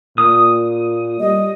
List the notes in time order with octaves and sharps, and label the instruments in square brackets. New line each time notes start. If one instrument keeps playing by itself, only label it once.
[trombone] A#2 [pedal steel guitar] D#6
[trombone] G3 [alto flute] D#5